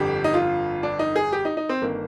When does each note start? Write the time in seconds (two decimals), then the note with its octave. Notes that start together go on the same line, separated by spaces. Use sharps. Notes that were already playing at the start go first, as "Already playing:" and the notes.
Already playing: G1 F2 D3 G4
0.24 D#4
0.34 F4
0.83 D4
0.99 D#4
1.16 G#4
1.32 G4
1.45 D#4
1.57 D#4
1.69 C4
1.82 G1 D#3 A#3